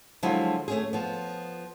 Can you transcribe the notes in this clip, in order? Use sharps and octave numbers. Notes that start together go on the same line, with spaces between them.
D3 F3 F#3 G#3 E4 F4
A3 C#4 G#4
F3 B3